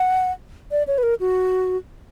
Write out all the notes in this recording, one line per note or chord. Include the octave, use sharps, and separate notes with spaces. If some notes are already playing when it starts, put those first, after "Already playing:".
Already playing: F#5
D5
C#5
B4
A#4
F#4